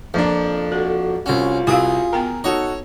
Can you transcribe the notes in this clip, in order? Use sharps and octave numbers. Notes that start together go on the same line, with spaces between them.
F2 F3 A#3 D4
F#4 A4
C2 C#4 F4 F#4
C2 E4 F#4 G#4 F5
B3 A#4 G5 A#5
D#4 F#4 A4 C#5